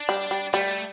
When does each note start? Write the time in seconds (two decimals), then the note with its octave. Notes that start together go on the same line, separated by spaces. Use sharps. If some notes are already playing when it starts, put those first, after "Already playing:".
Already playing: D4
0.09 G3
0.31 G3
0.53 G3 A3